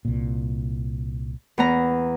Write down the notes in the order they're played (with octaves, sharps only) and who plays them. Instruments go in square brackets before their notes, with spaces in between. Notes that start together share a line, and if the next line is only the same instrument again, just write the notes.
[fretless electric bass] C2 A#2
[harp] E2 B3 A#5